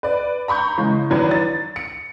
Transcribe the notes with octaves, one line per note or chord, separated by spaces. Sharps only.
B4 D5
A#5 B5 C#6 G6
C#3 E3 G#3
D#3 E3 F#3 D4 B4
A6
C#7